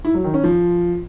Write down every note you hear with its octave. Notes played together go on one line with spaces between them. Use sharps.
E4
F#3
D#3
C#4
F3